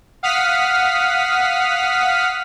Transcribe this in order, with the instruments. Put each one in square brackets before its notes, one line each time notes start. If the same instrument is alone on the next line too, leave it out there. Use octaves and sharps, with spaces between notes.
[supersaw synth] F5 F#5 D#6 F6 B6